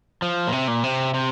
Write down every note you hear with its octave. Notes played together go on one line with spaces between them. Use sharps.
F3
A#2
C3
A#2
C3
C3